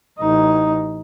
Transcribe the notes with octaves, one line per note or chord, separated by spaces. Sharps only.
A1 D#4